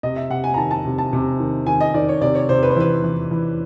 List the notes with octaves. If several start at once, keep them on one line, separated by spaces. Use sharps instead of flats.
C3 D#5
E5
C3 F#5
G#5
A#5
D#3 A5
A5
C3
A5
C3
D#3
D#3 G#5
D#5
D#3 D5
C#5
C3 D5
C#5
C3 C5
B4
C5
E3 B4
E3
E3